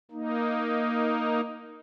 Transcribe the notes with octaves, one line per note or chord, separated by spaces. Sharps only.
A#3 D#4